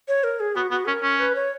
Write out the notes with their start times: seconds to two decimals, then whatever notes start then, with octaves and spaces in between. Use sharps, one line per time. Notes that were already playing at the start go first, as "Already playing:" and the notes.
0.08 C#5
0.24 A#4
0.40 G#4
0.55 B3 F#4
0.71 B3 F#4
0.87 C#4 A#4
1.03 C#4
1.19 B4
1.35 C#5